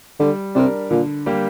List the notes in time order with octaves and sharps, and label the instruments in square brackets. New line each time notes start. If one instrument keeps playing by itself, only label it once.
[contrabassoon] D3 [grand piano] G3
[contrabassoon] C3 [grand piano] D4 A#4
[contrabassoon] A#2 [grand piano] D3
[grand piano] G3 A#3 G4